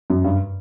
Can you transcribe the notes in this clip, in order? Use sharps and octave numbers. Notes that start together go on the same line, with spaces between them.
F#2
G2